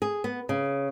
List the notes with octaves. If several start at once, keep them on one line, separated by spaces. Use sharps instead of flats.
G#4
B3
C#3